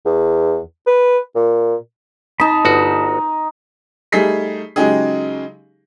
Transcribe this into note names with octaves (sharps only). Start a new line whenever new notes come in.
E2
B4
A#2
D#4 D#5 A5 B5
G1 F#4
G3 A3 D#4 G#4 B6 C7
C#3 F#3 G#3 D#4 G4 G#4